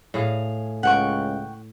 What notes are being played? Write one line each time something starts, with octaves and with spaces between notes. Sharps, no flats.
A2 G#4 F5
C#2 F#5 G5 C#6